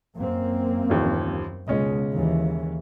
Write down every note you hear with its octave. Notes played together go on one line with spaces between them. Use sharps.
F#2 A#3 C4
A1 D#2 F3
C#2 B2 G#3 C#4 D#5
D#2 E3